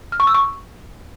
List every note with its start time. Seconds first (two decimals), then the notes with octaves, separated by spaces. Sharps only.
0.12 F6
0.20 C#6
0.27 E6
0.34 C#6